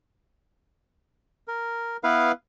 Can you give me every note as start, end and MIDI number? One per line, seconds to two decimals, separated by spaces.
1.48 1.97 70
2.04 2.32 59
2.04 2.32 64
2.04 2.32 71
2.04 2.32 77